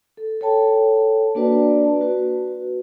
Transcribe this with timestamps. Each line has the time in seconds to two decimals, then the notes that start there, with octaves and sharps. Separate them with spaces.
0.17 A4
0.41 A4 C#5 G5 A5
1.35 A#3 D4 F#4 B4 D5 A5
2.01 F#4 B4